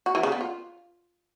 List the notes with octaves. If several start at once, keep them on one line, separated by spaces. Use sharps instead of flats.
F#4
E3
C#3
B3
F4